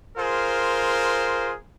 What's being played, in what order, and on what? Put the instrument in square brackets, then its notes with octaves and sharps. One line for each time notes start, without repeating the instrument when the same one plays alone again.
[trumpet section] F4 G#4 A#4 C5